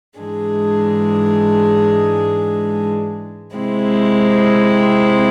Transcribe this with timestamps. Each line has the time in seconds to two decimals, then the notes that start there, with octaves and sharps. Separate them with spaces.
0.18 G#2 E3 G#3 D4 G#4
3.56 C3 G#3 C4 E4